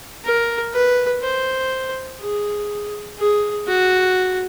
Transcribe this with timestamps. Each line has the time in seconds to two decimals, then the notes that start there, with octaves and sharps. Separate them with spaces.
0.24 A#4
0.73 B4
1.22 C5
2.20 G#4
3.18 G#4
3.67 F#4